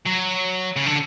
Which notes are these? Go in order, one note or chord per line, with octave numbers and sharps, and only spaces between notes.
F#3
C#3
D3